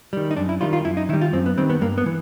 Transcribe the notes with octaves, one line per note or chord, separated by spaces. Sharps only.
D#3 G3
D#4
F#2 D4
E4
D#3 G3 F4
F4
F#2 E4
D#4
D#3 G3 E4
F4
F#2 C4
B3
D#3 G3 C4
B3
G2 A#3
B3
E3